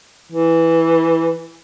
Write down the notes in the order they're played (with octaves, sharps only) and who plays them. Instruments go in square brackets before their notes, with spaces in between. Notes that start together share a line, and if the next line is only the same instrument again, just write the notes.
[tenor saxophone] E3